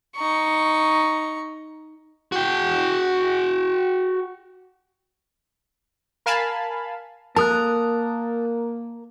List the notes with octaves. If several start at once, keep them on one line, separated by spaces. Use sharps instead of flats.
D#4 C#6
F#4 G5
A#4 F5 G#5 A5 B5
A#3 A#4 A5 D#6 F#6